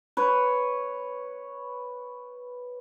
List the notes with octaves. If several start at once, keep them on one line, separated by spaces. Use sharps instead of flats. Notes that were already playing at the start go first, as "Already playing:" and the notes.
B4 C#5